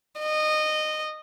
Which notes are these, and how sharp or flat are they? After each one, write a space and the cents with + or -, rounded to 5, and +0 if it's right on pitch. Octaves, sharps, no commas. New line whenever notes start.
D#5 -20